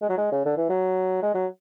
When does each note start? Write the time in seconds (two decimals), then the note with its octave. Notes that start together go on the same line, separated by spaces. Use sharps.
0.01 G#3
0.09 F#3
0.17 G#3
0.32 C#3
0.45 D3
0.57 E3
0.69 F#3
1.23 G#3
1.34 F#3